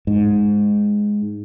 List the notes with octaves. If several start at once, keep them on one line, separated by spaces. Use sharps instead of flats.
G#2